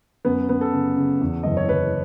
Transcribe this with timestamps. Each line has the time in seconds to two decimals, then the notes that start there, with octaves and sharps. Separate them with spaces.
0.25 F#2 B3
0.49 F#2 B3
0.61 A4
0.73 C#3
0.97 C#3
1.21 E2
1.43 F#1 D#5
1.57 C#5
1.69 F#1 B4